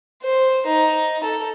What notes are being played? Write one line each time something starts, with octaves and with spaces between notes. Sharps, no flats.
C5
D#4
A4